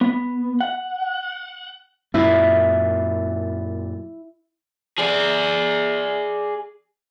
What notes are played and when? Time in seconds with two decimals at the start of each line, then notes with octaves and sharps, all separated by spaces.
0.01 B3
0.61 F#5
2.14 F#2 A#2 E4
4.98 G#4 D5